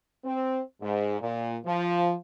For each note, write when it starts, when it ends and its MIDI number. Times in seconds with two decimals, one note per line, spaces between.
0.24 0.60 60
0.82 1.18 44
1.21 1.56 46
1.65 2.13 53